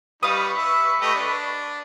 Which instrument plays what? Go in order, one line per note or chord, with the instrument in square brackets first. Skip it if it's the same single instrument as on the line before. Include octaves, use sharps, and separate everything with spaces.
[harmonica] G3 D#4 [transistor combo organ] B4 C#6 [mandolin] F5 D#6
[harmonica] E5
A3 G4 D#5
D4